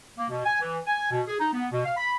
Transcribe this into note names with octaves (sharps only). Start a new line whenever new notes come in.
A#3
B2
G#5
E3
G#5
B2
G#4
D#4
B3
B2
F5
B5